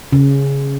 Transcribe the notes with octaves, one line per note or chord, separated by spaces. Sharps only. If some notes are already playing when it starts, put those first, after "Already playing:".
C#3